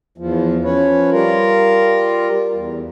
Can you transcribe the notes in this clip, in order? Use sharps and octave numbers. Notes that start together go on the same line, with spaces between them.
E2 F3
F3 C#4 B4 C#5
G3 F4 A#4
E2